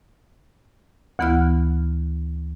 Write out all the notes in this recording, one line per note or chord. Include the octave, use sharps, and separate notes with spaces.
D2 E3 B3 E4 F6 F#6